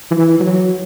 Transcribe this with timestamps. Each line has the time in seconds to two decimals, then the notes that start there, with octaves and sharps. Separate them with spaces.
0.11 E3
0.40 F#3